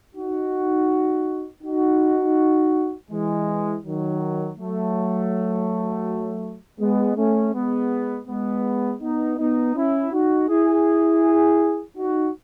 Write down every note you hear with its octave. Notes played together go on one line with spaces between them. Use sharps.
D#4 F#4
D#4 F#4
E3 G#3
D#3 F#3
F#3 A3
G#3 B3
A3 C#4
G#3 B3
G#3 B3
B3 D#4
B3 D#4
C#4 E4
D#4 F#4
E4 G#4
D#4 F#4